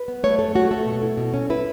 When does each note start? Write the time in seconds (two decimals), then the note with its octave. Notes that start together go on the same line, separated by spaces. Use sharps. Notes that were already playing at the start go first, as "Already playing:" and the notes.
Already playing: B4
0.08 B3
0.23 A3 C#5
0.39 F#2 A4
0.55 A3 F#4
0.71 A3 A4
0.86 B2
1.03 E4
1.17 B2
1.34 C#4
1.50 E4 B4